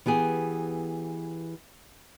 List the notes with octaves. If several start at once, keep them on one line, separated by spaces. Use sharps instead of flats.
E3 B3 G4 G#4